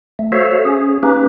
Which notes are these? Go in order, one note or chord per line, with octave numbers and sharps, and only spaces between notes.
A3
F#4 A4 C5 C#5 E5 F5
C#4 G#4
A#3 C#4 D#4 G4 B4